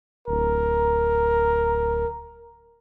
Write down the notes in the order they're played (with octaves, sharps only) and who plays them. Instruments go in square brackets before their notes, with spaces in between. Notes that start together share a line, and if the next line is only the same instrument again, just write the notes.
[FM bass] D1 [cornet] A#4